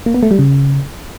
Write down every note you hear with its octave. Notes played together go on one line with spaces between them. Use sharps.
A#3
B3
A3
G3
C#3